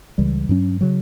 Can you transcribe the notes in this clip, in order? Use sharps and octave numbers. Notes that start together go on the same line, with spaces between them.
C#2 C#3 E3 G3
G2 F#3 C#4
C#3 F#3